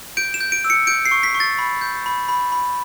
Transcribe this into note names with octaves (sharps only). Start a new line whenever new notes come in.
G6 D7
E7
G6
D7
E6
C#7
G6 D7
C7
C#6
B6
C#6
A6
B5
G6
B5
B5
B5